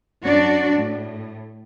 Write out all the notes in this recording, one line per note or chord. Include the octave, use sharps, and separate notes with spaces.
F#2 D4 F#4 D5
A2